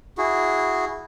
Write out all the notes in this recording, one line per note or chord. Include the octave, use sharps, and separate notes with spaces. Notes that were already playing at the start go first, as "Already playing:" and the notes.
E4 F#4 G#4